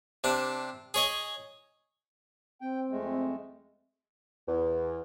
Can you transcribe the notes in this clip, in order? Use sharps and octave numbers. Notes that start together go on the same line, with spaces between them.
C3 D4
G#4 C#5 D#5
C4 G5
F2 G#3 A3
E2